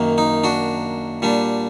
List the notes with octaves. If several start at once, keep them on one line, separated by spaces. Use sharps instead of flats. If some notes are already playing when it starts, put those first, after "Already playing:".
Already playing: F#2 D#3 F#3 A#3
D#4
D4 F#4
A#2 G3 D4